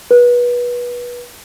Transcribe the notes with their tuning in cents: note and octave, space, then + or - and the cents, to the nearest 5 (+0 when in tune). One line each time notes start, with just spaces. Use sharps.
B4 -25